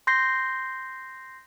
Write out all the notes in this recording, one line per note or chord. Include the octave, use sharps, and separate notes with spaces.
C6 G6 A#6 C7